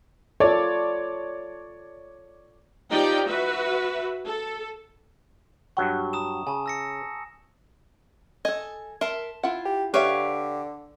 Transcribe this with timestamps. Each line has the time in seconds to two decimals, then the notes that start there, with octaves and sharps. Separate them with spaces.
0.40 F4 A4 C#5 D5
2.90 F3 D#4 G4 D5 G5
3.27 F#4 B4 E5
4.26 A4
5.77 G2 F#3 F#5 C#6
6.13 A#5 D#6 E7
6.47 C#3 G#5 A5
6.66 E6 A#6 C#7
8.45 A4 D#5 G#5
9.01 A#4 E5 A5 C6
9.43 E4 F4 F#5
9.65 G4
9.94 D3 G4 B4 C#5 E5 F5 C#6